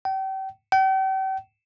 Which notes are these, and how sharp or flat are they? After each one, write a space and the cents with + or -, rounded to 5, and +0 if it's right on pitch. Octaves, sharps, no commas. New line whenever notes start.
G5 -35
G5 -40